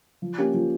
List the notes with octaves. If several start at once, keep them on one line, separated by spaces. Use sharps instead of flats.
F3
A#3 C#4 G4
F3